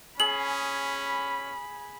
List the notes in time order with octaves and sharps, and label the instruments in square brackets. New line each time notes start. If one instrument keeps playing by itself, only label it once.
[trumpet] C#4 [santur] G#4 [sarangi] B5 [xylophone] F#7